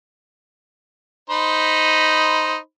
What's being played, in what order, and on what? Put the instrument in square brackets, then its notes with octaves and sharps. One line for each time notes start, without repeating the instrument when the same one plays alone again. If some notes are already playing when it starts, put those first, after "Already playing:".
[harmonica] D#4 C5 B5